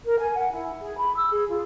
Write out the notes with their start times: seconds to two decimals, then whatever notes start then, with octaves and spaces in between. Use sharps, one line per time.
0.05 A#4
0.19 G#5
0.35 F#5
0.51 E4
0.80 G#4
0.97 B5
1.16 E6
1.29 G#4
1.48 F4